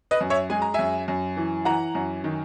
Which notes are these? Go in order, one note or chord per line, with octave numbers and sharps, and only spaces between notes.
B4 D#5
F#2
C#5 E5
G#3 G#5
A#5
F#2 E5 G#5
F#2
E3
E3 F#5 A#5
F#2
D#3